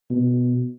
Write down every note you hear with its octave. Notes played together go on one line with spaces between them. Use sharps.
B2